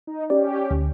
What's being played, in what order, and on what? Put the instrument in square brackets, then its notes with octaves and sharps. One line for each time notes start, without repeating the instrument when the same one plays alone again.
[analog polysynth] D#4
[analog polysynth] C#4 G4 [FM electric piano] D5
[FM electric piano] D2